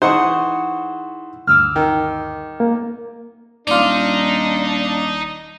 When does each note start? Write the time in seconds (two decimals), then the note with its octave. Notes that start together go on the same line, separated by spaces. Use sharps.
0.02 E3 D#4 E4 G#4 C5 F#5 C#6 D#6
1.47 D2 G2 D6 E6 F6
1.76 D#3
2.60 A#3
3.67 D#1 D4 D#4 F4 D5